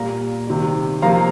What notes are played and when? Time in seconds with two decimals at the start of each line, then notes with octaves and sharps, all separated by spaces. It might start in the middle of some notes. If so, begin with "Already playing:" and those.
Already playing: A#2 G3 A#3 F5 A#5
0.47 C3 D#3 G3
1.02 C3 F3 A#3 F5 A#5